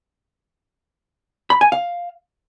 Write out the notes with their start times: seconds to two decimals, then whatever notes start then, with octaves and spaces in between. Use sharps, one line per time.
1.50 B5
1.61 G#5
1.72 F5